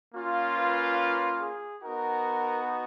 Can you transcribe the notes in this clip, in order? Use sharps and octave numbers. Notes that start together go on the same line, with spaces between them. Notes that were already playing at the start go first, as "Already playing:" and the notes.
A#3 C#4 F4
B4
G#4
B3 D#4 F#4 A#4